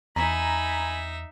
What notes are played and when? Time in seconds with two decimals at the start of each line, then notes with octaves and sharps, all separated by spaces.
0.16 E2 D#4 E5 G#5 A#5 B5